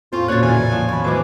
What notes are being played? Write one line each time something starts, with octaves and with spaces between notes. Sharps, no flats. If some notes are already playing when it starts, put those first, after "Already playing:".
E2 A2 C4 F4 F5
A#2 C#3 C#4 F#4 C5 C#5 F#6 A6
E2 E3 G#5
F3
D#3 B3 F4 C#5 B5
A2 E3 F#3 C5 D#5 D6